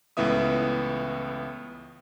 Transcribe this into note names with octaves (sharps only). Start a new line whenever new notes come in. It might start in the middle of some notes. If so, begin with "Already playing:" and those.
C#2 A2 E3 B3 E5 D#6